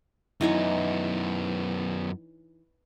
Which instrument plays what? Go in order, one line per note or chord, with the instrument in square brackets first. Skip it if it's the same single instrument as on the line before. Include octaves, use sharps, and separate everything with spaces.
[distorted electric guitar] F#2 B3 [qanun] E3 D#4 C#5